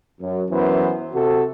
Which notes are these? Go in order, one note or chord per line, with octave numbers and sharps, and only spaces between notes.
F#2
F#2 E3 B3 C5
C3 F#4 A4